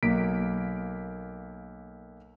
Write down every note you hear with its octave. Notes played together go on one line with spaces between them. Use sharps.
B1 A#3 B6 D7